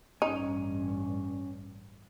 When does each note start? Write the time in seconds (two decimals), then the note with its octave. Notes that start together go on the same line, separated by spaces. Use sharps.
0.22 A1 G2 C#4 D#4 G#5